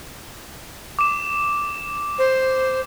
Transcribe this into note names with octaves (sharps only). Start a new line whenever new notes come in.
D6 E7
C5